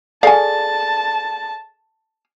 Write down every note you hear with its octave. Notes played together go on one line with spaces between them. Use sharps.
G#4 A4 D5 F5 G#5 A5